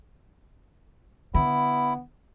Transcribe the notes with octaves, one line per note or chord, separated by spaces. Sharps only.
D3 B3 E4